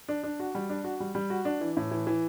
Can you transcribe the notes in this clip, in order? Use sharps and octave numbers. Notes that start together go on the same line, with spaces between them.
D4
D4
F#4
G3
D4
F#4
G3
G3
F#4
D4
E3
A2
E3
E3